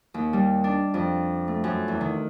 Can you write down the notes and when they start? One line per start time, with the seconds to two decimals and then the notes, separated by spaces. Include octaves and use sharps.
0.14 D#2
0.33 G3
0.64 D4
0.94 F2
1.48 A3
1.64 F#2
1.88 E2
2.01 D#3